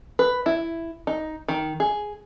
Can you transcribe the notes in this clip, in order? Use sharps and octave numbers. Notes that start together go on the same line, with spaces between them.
B4
E4
D#4
D#3
G#4